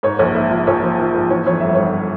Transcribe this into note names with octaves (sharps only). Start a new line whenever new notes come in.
G#2 C#5
A#1 C#5
G#2 E5
F3 C5
A#1 C#5
F3 C5
F3
G#2
E3 C#5
F2 C#5
G1 E5
G1 C#5